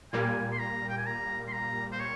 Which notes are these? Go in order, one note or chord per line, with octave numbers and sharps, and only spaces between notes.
A#2 G3 A#3 G#5
C6
A#5
G5
G#5
A#5
C6
A#5
C5
C#5